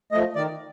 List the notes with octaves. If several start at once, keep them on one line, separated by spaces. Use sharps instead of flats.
F3 A3 D#5
D#3 D5